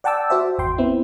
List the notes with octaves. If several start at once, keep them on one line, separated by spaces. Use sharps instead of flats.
D5 F#5 G5 A5 D6 E6
F#4 C5 E5
G#1 E2 G5 C6
B3 C4 E4